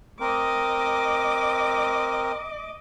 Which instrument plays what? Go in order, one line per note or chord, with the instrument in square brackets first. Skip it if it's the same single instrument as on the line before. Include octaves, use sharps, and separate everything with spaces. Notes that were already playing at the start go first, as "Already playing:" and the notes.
[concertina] C4 A#4 [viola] D#5 D6